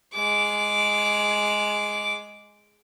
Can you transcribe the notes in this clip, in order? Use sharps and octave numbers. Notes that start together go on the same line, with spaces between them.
G#3 D6